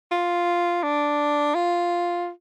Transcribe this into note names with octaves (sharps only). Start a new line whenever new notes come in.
F4
D4
F4